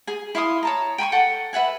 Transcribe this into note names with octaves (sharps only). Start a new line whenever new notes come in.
G#4 G#5
E4 F5 C6 D#6
C#5 A5 A#5
G5 G#5 B5 C#6
A4 F#5 G5
B4 E5 F#5 G#5